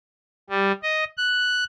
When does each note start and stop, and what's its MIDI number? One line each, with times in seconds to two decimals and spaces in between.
0.50 0.72 55
0.83 1.04 75
1.17 1.64 90